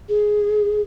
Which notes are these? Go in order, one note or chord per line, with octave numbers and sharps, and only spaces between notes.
G#4